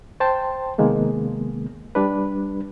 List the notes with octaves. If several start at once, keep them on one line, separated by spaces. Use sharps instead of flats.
C5 G5 A5 C6
C3 D#3 G#3 A#3 B3
G3 D4 B4